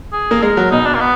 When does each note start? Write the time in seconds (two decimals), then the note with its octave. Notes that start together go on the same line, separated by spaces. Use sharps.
0.13 G#4
0.31 A#3
0.42 G#3 A#4
0.57 F#3
0.71 B2 D#4
0.86 D4
0.95 A#3
1.01 B3